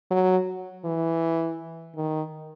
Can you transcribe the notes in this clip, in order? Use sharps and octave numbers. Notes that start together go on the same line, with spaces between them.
F#3
E3
D#3